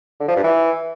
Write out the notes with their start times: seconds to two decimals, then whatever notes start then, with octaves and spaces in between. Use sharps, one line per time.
0.20 D3
0.28 F3
0.36 G2
0.44 E3